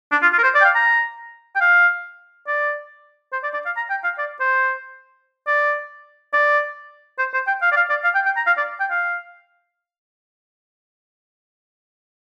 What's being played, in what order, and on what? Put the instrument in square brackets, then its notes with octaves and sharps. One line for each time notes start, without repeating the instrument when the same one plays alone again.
[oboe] D4
F4
F4
A#4
C5
D5
G5
F5
A#5
G5
F5
D5
C5
D5
D5
F5
A#5
G5
F5
D5
C5
D5
D5
C5
C5
G5
F5
D5
F5
D5
F5
G5
G5
A#5
F5
D5
G5
F5